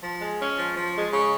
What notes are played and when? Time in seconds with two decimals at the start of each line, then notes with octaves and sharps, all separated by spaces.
0.02 F3
0.22 G#3
0.40 C#4
0.58 F3
0.76 F3
0.95 G#3
1.13 C#3